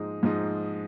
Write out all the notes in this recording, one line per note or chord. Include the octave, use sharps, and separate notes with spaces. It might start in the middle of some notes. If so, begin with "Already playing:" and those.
Already playing: G#2 F3 G#3 D#4
G#2 F3 G#3 D#4